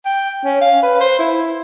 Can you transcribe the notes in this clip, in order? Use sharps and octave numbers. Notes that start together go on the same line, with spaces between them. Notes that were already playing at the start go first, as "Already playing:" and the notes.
G5
C#4
F5
B4
C5
E4